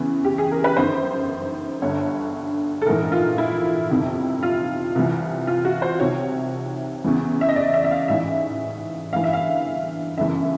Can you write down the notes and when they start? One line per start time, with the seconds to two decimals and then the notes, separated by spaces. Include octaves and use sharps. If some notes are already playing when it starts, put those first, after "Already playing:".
Already playing: E2 C#3 E3
0.24 G4
0.38 G#4
0.51 A#4
0.64 B4
0.77 G1 F#2 D#3 C5
1.82 G1 G2 D3 C#5
2.82 A4
2.86 A#1 G#2 E3 A#4
3.12 F4
3.38 E4
3.90 G1 F2 C3 D#3
4.43 F4
4.95 C2 C3 E3
5.47 F4
5.65 F#4
5.82 C5
5.99 C2 C3 D#3 C#5
7.04 E2 C#3 E3
7.41 E5
7.49 D#5
7.56 D5
7.74 E5
7.84 E5
7.91 F5
8.08 A1 G#2 E3 E5
9.12 G1 G2 E3 F5
9.24 E5
9.33 F5
10.17 G1 F#2 C#3 E3 E5